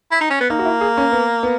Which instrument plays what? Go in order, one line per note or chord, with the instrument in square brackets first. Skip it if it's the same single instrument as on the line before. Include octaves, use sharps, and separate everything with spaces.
[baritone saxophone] E4
D#4
C#4
B3
[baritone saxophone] A#3 [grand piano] D#4
[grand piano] F#4
E4
G#4
C#4
B3
B3